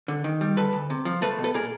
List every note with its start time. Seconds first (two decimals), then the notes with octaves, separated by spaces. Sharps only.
0.08 D3
0.24 D#3
0.41 G3
0.57 D2 A4 B4
0.73 D2
0.90 C3
1.05 F3
1.22 A3 A4 B4
1.38 B2
1.44 A4 B4
1.54 A#2 G#4 A#4